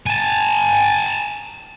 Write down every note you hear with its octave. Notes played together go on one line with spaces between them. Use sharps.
G#5 A5